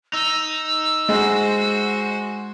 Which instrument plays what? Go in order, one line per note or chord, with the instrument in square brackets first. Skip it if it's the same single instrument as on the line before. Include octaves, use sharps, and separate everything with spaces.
[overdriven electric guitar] D#4 [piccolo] E6
[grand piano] G#3 [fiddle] F#4 C5